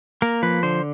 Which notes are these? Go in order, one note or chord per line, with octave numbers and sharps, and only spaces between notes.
A#3 A#4
F3 B4
D3 C5